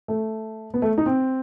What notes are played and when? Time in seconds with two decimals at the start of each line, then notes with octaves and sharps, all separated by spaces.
0.08 A3
0.74 B3
0.82 A3
0.98 D#4
1.06 C4